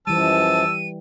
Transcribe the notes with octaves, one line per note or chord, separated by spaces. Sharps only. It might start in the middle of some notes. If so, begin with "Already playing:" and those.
F#2 E3 F3 G3 A5 E6 D#7